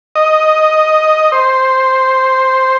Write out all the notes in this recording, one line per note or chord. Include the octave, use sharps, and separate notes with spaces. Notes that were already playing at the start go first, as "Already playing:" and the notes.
D#5
C5